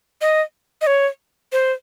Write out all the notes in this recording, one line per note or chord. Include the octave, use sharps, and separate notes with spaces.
D#5
D#5
C#5
C5